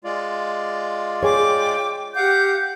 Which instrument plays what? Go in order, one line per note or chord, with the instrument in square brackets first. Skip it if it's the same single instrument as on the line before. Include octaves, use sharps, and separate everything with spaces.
[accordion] G#3 F4 D5
[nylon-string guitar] G#4 C#5 [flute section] G5 D6
[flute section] G4 F#5 G6 [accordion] F5 D6